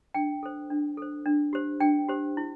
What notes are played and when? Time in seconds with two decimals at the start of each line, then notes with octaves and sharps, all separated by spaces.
0.14 D4 G5
0.43 A4 C5
0.70 D4
0.97 A4 C5
1.26 D4
1.53 G4 C5
1.80 D4 G5
2.09 G4 C5
2.37 E4